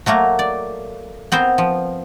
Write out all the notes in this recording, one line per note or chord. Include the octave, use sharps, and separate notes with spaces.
F#3 A3 A#3 A#4
D5
B3 C4 A#4 C5
F3